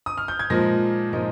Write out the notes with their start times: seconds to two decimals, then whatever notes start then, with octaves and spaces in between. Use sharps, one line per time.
0.06 D#6
0.18 F6
0.28 G6
0.39 G#6
0.50 A#2 F3 G#3 D#4 A#6
1.13 A#2 F3 G#3 D#4